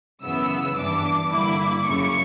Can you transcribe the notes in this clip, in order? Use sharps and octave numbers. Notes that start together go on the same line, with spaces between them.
F#2 C#3 E3 B3 E6
G2 E3 B3 D4 D6
G2 D3 A#3 E4 D6
F#2 C#3 F#3 C#6